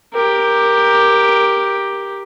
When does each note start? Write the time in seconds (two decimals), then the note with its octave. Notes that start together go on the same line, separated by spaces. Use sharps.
0.14 G4 A#4